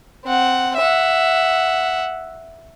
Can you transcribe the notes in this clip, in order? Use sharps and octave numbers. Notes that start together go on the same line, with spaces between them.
C4 F#5
E5 F#5